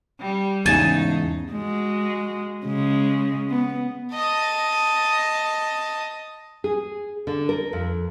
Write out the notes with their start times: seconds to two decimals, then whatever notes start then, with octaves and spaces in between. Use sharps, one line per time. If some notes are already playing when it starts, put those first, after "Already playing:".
0.20 G3
0.66 E2 G#2 C#3 D#4 G#5 A5
1.53 G#3 F#4
2.66 C#3 G#3
3.49 B3
4.15 D#5 A5
6.64 G#4
7.27 D3
7.49 A#4
7.73 F2